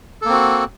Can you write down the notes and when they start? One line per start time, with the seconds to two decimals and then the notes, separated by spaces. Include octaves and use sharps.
0.22 A4
0.25 A#3
0.29 C4
0.33 F#4